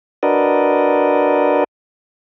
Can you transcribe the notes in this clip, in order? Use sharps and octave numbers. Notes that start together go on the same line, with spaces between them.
D4 F#4 A#4 B4 D5 D#5